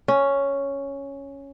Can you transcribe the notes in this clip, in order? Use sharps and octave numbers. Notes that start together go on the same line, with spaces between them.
C#4